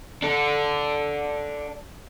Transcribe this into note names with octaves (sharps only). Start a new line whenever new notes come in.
D4 A4